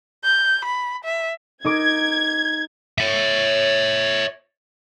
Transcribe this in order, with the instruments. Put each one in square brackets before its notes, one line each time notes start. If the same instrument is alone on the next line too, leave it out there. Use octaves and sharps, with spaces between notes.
[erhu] G6
B5
E5
[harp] D#4 A#4 D6 [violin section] G#6
[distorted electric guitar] C#5 E5